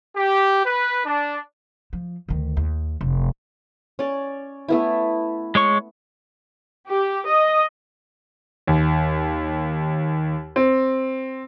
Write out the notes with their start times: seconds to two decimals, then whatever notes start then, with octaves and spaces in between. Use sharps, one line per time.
0.15 G4
0.65 B4
1.05 D4
1.93 F3
2.29 D2 D#3
2.57 D#2
3.01 F1
3.99 C#4 D5
4.68 A3 B3 E4
5.55 G#3 C#5 C#6
6.88 G4
7.26 D#5
8.67 D#2
10.56 C4